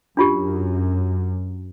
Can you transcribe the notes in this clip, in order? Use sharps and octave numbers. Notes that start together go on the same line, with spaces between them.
F#2 D4 F4 G4